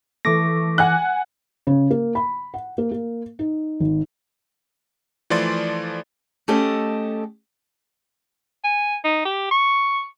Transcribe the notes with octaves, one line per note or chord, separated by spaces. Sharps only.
E3 A3 D6 A#6
F#5 G#5 F#6
C#3
A#3
B5
F#5
A#3
A#3
D#4
G#1
E3 F3 A3 D5 C6 A6
A3 C#4 G4 A4 D#5
G#5
D#4
G4
C#6